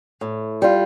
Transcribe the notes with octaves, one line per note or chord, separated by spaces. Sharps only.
A2
G3 F4